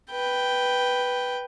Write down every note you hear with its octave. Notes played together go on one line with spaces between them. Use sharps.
B4 G5